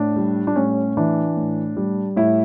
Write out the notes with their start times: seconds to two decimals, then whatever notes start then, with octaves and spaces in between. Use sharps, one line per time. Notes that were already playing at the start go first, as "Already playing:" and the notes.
Already playing: A2 D4
0.16 G3
0.47 D4
0.56 A2 C#4
0.97 E3 D4
1.36 A2
1.77 G3
2.16 A2 E4